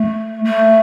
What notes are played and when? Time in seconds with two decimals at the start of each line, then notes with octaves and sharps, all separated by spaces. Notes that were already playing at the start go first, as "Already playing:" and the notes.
Already playing: A3
0.45 A3